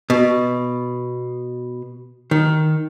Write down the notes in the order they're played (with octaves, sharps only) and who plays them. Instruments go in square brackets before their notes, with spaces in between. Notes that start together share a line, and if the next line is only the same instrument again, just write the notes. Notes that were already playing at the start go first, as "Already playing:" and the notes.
[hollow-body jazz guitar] B2
D#3